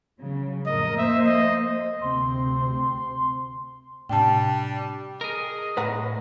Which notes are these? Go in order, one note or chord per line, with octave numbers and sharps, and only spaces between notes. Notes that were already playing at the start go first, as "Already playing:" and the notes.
C#3 F#3
F2 A2 A#4 D#5
A#3 C5 E5
D#5
D2 C3 C4 C6
A2 C3 G3 D4 G5 A5
G#4 A#4 D#5
A2 B4 F#5 A#5